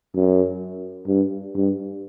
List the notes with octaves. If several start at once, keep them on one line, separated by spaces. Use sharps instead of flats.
F#2
G2
G2